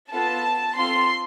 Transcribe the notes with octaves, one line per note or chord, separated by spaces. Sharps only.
B3 F4 A4 A5
C4 F4 A4 C6